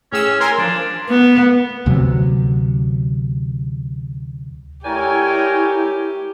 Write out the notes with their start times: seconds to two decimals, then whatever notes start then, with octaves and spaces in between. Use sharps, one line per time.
0.12 A2 C#4 G#4 E6
0.40 A#4 G#5 C6
0.58 F3 D4
1.09 B3
1.86 D2 C3 F#3
4.85 A3 E4 G4 A#4 C#5 D5 G5 G#5